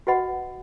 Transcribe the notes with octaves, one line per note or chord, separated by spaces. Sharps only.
F#4 B4 D#5 F#5 B5